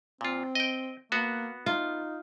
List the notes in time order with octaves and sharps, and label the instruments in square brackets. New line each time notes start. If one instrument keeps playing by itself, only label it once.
[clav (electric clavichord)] A#2 F4 [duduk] C4
[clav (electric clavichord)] D#5 G5
[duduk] A#3 [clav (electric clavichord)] B3 F#4
[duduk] D#4 [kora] F4